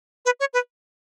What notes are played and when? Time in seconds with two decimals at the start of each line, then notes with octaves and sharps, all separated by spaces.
0.25 B4
0.40 C#5
0.53 B4